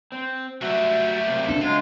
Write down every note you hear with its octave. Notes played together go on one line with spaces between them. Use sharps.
C4
F#3 G3 A3 F#4 E5
C3 A#3
D4 A4
C#3 F#3 G#3 F4